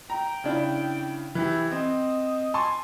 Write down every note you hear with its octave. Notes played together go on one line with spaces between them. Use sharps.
G5 A#5
C#3 D4 E4
E3 E4 G4
C4 D#5
G#5 A5 C6 C#6